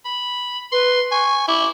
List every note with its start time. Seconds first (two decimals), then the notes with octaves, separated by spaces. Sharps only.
0.05 B5
0.72 B4 C6
1.11 G#5 C#6
1.48 E4 D6